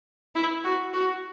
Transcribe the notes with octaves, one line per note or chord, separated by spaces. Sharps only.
E4
F#4
F#4